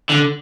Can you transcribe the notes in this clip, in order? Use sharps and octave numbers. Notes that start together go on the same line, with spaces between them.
D3